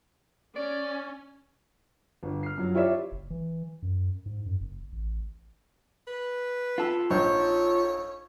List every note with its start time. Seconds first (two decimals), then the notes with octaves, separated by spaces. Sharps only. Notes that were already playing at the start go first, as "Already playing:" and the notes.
0.56 C#4 D5
2.23 G1
2.43 F6 C7
2.58 F#2 F3 F#3
2.74 E4 F4 G4 C#5 D5 E5
3.12 F#1
3.30 E3
3.82 F#2
4.26 G#2
4.46 F#2
4.60 F#1
4.92 A1
6.08 B4
6.78 F4 A4
7.11 A#1 D#4 C#5 G6